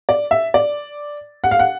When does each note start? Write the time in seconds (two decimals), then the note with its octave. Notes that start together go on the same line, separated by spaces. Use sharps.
0.09 D5
0.31 E5
0.54 D5
1.44 F#5
1.51 F5
1.59 F#5